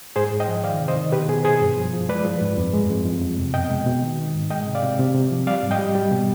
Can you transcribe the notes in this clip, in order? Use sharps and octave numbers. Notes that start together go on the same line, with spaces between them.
G#2 G#4 C5
G#2
D#5 G5
F3
D#3 D5 F5
C3
C5 D#5
D#3
B2 G4 B4
B2 G#4
B2 G#4 C5
G2
F3
F3
G#3 B4 D5
F3
G#2
F2
G#3
F2
F2
F2
C3
B2 D#5 G5
G#3
B2
D#3
D#3
G#2
G#3 D#5 G5
C3
D5 F5
C3
C3
C3
F3
G3 D5 F5
G#2
D#5 G5
G3
G3
B2